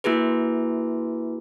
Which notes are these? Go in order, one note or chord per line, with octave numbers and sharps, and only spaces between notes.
A#3 E4 F#4 G#4 B4